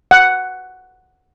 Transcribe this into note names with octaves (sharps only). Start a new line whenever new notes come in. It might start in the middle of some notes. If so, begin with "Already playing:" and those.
F#5